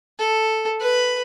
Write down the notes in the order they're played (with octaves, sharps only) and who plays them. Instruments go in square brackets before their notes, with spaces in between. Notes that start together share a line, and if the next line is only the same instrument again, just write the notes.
[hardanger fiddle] A4
B4 B5